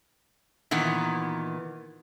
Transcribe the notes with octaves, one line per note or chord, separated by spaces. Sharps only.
A#2 D#3 E3 B3